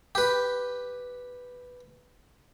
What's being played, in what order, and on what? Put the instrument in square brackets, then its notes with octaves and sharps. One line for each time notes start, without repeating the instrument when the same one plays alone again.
[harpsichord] G4 B4